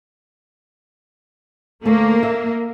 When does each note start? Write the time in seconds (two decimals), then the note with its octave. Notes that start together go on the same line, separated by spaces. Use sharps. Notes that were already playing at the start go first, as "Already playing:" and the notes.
1.85 D2 A3 A#3
2.23 E5